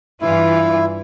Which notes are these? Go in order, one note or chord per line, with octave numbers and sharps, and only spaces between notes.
G2 E3 E4 F4